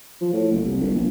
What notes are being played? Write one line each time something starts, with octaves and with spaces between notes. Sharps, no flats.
F3
A2
F#1
C2
G1
A#1